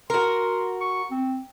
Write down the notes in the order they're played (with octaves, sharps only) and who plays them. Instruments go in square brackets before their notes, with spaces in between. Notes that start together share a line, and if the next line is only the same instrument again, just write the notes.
[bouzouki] F#4 A#4 [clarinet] C6
[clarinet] C#6
C4